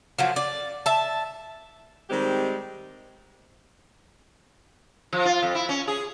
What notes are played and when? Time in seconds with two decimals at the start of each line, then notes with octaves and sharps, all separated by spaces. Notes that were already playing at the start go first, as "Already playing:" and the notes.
0.18 A#2 F3 F#3
0.36 D5
0.86 E5 A5
2.10 D#3 G3 G#3 C4 G4
5.13 F3
5.25 F4
5.43 F2
5.55 E4
5.69 C#4
5.88 G#4